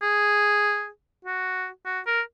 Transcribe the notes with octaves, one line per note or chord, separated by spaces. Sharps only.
G#4
F#4
F#4
A#4